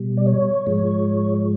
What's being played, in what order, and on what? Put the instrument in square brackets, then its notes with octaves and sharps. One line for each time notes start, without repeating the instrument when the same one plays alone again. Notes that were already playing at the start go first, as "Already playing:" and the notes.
Already playing: [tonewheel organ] B2 G3
D5
C#5
G#2 F3 G#3